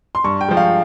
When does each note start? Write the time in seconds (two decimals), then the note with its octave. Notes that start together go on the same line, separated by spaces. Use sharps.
0.15 C6
0.24 G2 C#6
0.41 G5
0.48 F3 G#3
0.57 F5